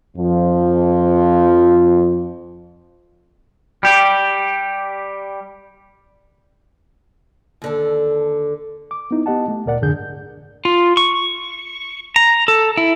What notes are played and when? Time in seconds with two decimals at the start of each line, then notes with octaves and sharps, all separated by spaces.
0.17 F2 F3
3.83 G3 G4
7.62 D#2 D3 A4
8.91 D6
9.11 B3 D#4 E4
9.26 B3 G4 D#5 F#5 A5
9.48 A3
9.66 D2 A#2 A#4 D5 F#5
9.82 F2 G#2 D3 D4 G#4 G6
10.65 F4
10.97 C#6
12.16 A#5
12.48 A4
12.77 E4